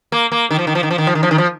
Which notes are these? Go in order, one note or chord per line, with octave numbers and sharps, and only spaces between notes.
A#3
A#3
D#3
F3
D#3
F3
D#3
F3
D#3
F3
D#3
F3
D#3
F3